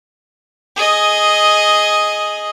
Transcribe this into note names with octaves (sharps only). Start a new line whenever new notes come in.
G#4 D#5